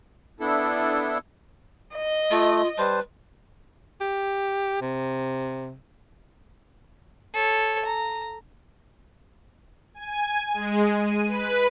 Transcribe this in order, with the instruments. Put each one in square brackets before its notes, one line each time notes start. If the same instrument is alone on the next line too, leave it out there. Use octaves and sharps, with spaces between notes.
[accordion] B3 D4 E4 A4
[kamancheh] D#5
[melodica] A3 [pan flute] F4
[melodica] G3 C5 A5 [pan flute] B4
[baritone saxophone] G4
C3
[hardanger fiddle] A4 C#5
A#5
[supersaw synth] G#5
G#3
D#7
B4